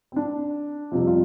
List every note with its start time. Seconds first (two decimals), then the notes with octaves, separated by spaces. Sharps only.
0.12 C4
0.16 D4
0.92 F2 C3 G3 F4
1.07 F4